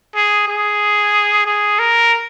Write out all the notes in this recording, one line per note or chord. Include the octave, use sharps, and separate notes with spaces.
G#4
G#4
G#4
A#4